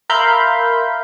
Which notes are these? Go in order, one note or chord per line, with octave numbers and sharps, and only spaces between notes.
A#4 E5 F5 B5 C6 G6